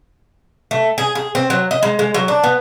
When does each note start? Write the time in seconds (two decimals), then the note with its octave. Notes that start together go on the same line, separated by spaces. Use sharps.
0.71 A3
0.98 G#4
1.15 G#4
1.35 C4
1.50 F#3
1.71 D#5
1.83 G#3
1.99 G#3
2.14 F#3
2.28 D4
2.44 B3